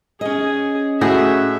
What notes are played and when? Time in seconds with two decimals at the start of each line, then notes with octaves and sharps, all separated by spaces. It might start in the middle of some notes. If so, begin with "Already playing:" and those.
0.21 C#4 G#4 D#5
1.01 A2 F#4 G#4 E5